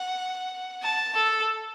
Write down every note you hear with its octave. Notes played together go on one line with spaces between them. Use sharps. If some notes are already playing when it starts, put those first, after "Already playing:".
Already playing: F#5
A5
A4